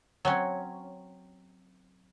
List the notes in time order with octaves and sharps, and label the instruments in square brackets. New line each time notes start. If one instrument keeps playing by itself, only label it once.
[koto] F#3 C4 C#4